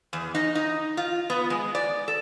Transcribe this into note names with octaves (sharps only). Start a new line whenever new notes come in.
E2
D#4
D#4
F4
B3
G#3
D5
A4